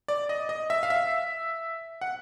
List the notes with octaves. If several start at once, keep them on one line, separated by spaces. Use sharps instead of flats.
D5
D#5
D#5
E5
F5
E5
F#5